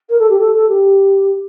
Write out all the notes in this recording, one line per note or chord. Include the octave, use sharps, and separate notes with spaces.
A#4
A4
G4
A4
A4
G4